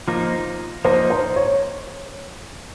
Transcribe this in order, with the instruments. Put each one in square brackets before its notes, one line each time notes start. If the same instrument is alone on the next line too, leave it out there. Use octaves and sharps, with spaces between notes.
[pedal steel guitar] F3 A#3 D#4 [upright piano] F4
[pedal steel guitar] F3 A#3 D#4 [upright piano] C5
[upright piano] C5
C#5